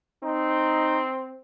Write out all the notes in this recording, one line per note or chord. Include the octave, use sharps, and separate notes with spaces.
C4 D#4